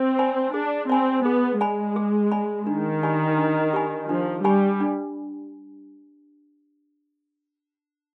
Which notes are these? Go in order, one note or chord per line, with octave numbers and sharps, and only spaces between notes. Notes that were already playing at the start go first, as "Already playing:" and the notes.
Already playing: C4
D5 G#5 B5
D4 G#4
C4 D5 G#5 B5
B3 G#4
G#3 D5 G#5 B5
G#4
D5 G#5 B5
D#3 D4
G4 D5 G#5 B5
D4
G4 D5 G#5 B5
F3 D4
G3 G4 D5 G#5 B5
D4